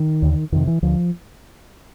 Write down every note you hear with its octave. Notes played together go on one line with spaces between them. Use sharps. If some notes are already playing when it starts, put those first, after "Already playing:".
Already playing: D#3
D#2 D3
F2 C3 D#3
E3
D2 D3 F3